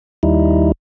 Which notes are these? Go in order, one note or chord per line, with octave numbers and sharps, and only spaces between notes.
D#2 G3 D#4 E4